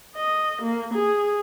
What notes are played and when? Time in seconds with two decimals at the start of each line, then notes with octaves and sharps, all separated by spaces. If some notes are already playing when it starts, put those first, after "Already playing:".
0.15 D#5
0.62 A#3
0.94 G#4